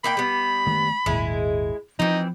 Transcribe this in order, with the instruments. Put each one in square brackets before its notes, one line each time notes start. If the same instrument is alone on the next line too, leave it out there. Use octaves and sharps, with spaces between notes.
[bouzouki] A#3 D#4 G5 [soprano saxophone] B5
[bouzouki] G3 B3
[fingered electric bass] D#3 G#3 A3
[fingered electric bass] G#1 D#2 A#2 [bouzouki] G#3 E4
[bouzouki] E3 C4 [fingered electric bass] F3 [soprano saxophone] D#4